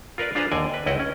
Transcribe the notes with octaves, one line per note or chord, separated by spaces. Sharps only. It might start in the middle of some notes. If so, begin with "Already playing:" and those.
F4 A#4 B4 D5 F5
D4 F4 G#4 B4 C5 A#5
D#2 D3 D5 D#5 G#5
B4
C#2 E4 D#5 F#5 G5
C#4